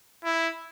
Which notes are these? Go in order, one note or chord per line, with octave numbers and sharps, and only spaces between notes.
E4